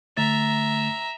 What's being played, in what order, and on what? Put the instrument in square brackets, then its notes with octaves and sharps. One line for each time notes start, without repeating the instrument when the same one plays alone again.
[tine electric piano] D3 A3 A6 [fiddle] E5 A#5